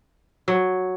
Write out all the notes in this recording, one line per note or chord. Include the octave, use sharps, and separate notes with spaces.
F#3